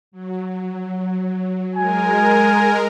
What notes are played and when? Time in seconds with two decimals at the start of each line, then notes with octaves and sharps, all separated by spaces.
0.11 F#3
1.75 G#3 A#4 G#5